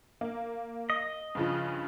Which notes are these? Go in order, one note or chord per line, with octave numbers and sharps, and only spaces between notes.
A#3
D#5
G2 C#3 F3